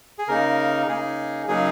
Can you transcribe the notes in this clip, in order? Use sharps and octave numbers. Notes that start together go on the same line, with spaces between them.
G#4
C#3 A#3 D#4 A#4
C#3 A#3 D#4 G#4
C#3 F#3 A#3 D#4 G#4